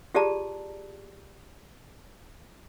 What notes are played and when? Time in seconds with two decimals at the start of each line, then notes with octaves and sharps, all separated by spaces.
0.14 F4 G4 G#4 D5 A5 A#5